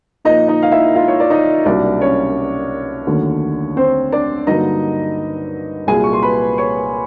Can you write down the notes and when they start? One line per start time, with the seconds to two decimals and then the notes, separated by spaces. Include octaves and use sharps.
0.25 A#2 F3 A#3 D#4 D#5
0.48 D#4 D#5
0.62 F5
0.72 E4 E5
0.95 F4 F5
1.08 C#5
1.20 D5
1.30 D#4 D#5
1.65 C2 B2 F#3 A#3 D4 D5
2.01 C#4 C#5
3.06 D#2 D3 F#3 A3
3.77 C4 C5
4.12 D4 D5
4.47 G2 D3 F#3 A#3 D#4 D#5
5.87 C2 A#2 F#3 G#4 G#5
6.04 C#6
6.13 C6
6.22 B4 B5
6.58 C#5 C#6